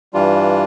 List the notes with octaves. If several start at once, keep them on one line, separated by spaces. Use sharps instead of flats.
G2 E3 G3 D4 F4